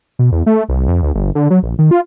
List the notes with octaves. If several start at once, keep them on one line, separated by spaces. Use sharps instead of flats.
B2
E2
A3
C2
F2
D2
G1
D3
F#3
A#1
D#3
F4